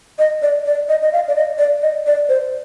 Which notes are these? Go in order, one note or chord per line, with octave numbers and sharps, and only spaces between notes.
D#5
D5
D5
D#5
D#5
F5
D5
D#5
D5
D#5
D5
C5